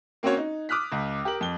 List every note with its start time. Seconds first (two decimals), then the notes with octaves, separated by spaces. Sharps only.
0.23 A#3 C4 C#4 F#4 C#5
0.37 D#4
0.69 D6 D#6 F6 F#6 B6
0.92 C#2
1.25 G4 A#4 F#7
1.41 F2 G7